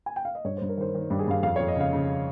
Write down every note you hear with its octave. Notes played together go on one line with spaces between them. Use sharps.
G#5
G5
F5
D#5
G2 C#5
G2 C5
A#4
D#3 C5
D#3
G2 G4
G#4
G2 F5
F2 F5
F2 C#5
D#5
C#3 F5
C#3